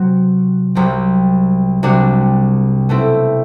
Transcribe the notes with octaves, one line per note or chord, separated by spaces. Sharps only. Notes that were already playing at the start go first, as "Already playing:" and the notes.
Already playing: C3 F#3 C4 F#4
C2 C3 F#3 C4
C2 C3 G3 D4 F#4
B2 A3 C4 E4